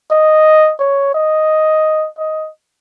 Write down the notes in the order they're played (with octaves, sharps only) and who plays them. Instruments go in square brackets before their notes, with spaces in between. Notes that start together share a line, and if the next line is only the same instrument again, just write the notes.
[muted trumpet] D#5
C#5
D#5
D#5